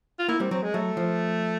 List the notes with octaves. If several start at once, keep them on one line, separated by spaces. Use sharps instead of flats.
F4
A#3 E4
G3 C4
F#3 C4
G#3
F#3 A3
F3